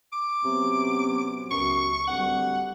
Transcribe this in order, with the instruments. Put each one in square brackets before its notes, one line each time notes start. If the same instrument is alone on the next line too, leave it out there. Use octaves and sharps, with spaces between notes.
[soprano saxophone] D6
[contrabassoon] C3 [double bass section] F#3 B3 C#4
[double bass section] C#2 [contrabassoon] F#2 [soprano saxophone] C#6
[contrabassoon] D1 [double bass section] G3 [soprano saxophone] F#5